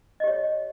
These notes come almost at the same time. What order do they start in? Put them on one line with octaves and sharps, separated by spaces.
D#5 G4 C#5